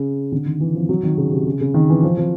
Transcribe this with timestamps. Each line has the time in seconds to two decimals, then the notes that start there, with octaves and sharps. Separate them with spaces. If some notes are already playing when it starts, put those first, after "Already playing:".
Already playing: C#3
0.32 D3
0.46 D#3
0.60 E3
0.75 F3
0.89 F#3
1.03 D#3
1.17 C#3
1.32 C3
1.46 C#3
1.61 C#3
1.74 D#3
1.89 E3
2.03 F3
2.17 F3